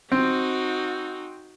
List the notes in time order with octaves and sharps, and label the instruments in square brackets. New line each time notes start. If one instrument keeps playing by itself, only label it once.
[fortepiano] C4 [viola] D#4 F#4